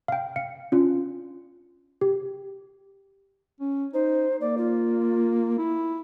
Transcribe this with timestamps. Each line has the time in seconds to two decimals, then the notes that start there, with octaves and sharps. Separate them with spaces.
0.08 F5 G5
0.36 F5 C#7
0.72 C#4 D4 F4
2.01 G4
3.61 C#4
3.94 D#4 C5
4.41 A#3 D5
4.57 F4
5.59 E4